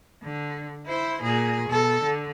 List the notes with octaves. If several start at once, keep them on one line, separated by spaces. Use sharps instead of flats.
D3
E4 C5
A#2 G#4
B2 A4
D3